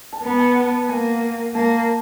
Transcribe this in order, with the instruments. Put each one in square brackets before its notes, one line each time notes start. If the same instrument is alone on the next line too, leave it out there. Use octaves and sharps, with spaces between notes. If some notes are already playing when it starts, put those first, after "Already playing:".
[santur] A5
[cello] B3 [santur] A#5
[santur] G#5
A5
F#5
[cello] A#3 [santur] G#5
[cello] A#3 [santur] A5